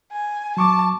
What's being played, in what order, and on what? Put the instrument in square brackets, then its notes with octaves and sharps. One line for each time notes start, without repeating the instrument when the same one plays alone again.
[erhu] G#5
[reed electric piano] F#3 C#6 D6 [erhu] A5